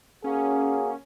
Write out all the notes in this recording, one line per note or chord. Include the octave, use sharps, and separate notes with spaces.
A#3 C#4 F#4 G#4